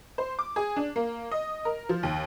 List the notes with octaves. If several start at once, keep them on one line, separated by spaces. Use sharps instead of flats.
C5
D6
G#4
D4
A#3
D#5
A#4
F3
D#2